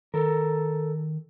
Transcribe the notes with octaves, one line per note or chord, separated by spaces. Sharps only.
D#3 A4 A#4